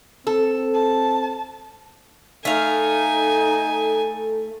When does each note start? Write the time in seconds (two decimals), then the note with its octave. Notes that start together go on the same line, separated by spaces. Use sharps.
0.27 C4 A4
0.74 A5
2.45 A3 D#4 A4 F5 G#5